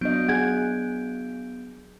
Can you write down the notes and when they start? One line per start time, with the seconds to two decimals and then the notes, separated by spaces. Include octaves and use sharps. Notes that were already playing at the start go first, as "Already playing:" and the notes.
0.01 F#3 B3 D4 D#5 G6 D7
0.29 G#4 F#5 G#6